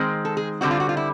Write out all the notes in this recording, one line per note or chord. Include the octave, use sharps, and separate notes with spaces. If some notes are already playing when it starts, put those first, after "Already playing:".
Already playing: D#3 G#3 C4
A4
G#4
D3 G3 C4 F#4
F4
F#4
F4
E4